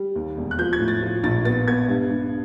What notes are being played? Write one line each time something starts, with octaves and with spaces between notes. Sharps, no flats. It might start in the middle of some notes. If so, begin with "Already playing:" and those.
Already playing: G3
D#2
E1
F#6
F3 G6
G#6
A2
A6
F3
A#1 A6
B3 A6
B3 G#6
G2
G2